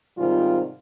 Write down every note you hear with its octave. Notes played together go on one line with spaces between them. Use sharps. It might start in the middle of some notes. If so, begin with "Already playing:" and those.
G#2 C3 D#3 G3 F4